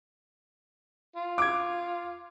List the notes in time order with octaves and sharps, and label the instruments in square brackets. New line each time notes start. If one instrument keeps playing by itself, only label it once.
[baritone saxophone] F4
[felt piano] D6 G#6